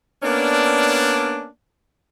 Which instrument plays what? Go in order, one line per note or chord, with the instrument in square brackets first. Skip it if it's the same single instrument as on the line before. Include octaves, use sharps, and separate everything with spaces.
[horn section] A#3 B3 C#4 D4